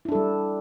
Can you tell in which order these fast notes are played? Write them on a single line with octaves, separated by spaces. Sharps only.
E4 D4 A4 G3